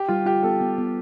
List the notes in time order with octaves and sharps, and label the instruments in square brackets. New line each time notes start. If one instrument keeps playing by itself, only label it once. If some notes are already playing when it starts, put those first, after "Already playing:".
Already playing: [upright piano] G4
[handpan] G3 [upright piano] F4
[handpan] F4 [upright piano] G4
[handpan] B3 [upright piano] A4
[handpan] B3
B3